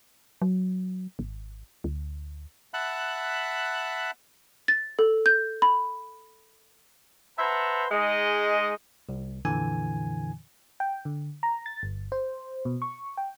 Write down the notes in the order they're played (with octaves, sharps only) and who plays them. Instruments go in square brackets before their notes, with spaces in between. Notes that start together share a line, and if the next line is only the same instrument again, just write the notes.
[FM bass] F#3
G#1
D2
[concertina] E5 F#5 A5 B5 F#6
[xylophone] A6
A4
G6
B5
[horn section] B4 C5 E5 F#5 A5 A#5
G#3 D#4 D#5
[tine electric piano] C2
F2 A#2 D3 E3 G#5
[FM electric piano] G5
D3
A#5
A6
G1
C5
B2
C#6
G5